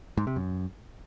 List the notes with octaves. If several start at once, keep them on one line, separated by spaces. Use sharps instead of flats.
G#2
C3
F#2